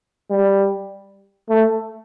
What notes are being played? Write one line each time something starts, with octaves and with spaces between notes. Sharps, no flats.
G3
A3